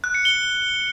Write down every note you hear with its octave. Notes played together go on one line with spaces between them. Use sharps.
F#6
C#7
G7